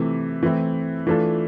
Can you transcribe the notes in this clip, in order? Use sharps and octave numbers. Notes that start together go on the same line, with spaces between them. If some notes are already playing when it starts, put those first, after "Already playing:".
Already playing: C3 E3 A3
E3 A3 C4 E4
E3 A3 D4 F4 A4